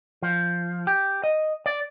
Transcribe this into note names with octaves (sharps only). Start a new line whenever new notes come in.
F3
G4
D#5
D5